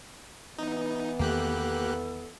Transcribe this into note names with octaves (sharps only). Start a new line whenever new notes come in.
E3 B3 D#4
E2 D#3 A3 A#3 G4 A4 F#6